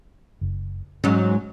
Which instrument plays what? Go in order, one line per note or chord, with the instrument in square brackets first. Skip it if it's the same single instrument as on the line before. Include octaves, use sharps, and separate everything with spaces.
[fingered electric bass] F#1
[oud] G#2 F#3 [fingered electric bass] C#4